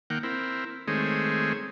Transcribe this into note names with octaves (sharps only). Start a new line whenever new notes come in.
D#3 A#3 F#5 G5
C4 E4 A#4
D#3 G#3 A3 C4 G#4 C#5